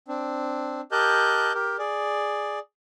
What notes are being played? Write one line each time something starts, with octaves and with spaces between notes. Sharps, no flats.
C4 D4
G4 A#4 D#5 A5 F#6 G6
G4 A#4
G#4 D5